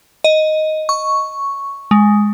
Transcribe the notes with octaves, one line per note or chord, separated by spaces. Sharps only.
D#5
C#6
G#3